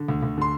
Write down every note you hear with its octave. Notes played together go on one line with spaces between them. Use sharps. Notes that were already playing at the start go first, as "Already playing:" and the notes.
Already playing: D3
D2
D2
D3 C6